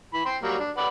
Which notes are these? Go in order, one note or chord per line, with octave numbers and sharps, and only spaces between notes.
E3 B5
C5 G5 C6
F#3 G3 A#3
D4
B4 D5 F#5